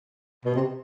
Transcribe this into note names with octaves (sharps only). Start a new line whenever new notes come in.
B2
C3